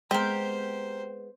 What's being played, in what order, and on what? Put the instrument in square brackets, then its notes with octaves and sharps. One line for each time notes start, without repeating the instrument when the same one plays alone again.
[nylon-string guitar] G#3 B3 [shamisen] C4 [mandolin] G4 A#4 [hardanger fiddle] C5